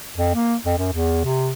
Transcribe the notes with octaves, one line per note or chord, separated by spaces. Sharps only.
F2
A#3
F2
F#2
E2
C3